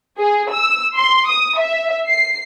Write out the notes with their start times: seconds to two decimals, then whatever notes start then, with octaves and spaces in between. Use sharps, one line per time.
0.19 G#4
0.51 E6
0.96 C6
1.29 D#6
1.59 E5
2.07 C7